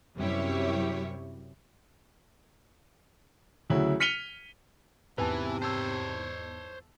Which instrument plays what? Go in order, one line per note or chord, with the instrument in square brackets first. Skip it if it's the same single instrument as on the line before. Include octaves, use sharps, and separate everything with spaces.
[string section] F#2 C3 G3 E4 G4 C#5
[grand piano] D2 C#3 F#3 E4
F6 B6 C#7 D#7 F7 G7
[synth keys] E2 G#2 [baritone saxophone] C3 [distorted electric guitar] E3 [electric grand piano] B4 G#5 A5
[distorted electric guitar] C5 C#5 [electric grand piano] A5 E6